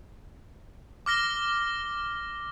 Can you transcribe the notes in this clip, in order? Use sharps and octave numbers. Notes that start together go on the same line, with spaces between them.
D6 F6 A#6 G7